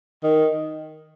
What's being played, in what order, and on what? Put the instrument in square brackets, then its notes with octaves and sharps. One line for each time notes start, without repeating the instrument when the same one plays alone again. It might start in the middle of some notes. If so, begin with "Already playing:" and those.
[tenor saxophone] D#3